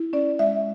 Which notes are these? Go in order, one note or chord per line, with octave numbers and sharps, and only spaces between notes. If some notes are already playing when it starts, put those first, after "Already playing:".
Already playing: E4
C#4 D5
G#3 E5